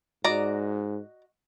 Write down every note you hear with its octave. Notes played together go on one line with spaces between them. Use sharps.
G#2 F#4 D5 D#5 A#5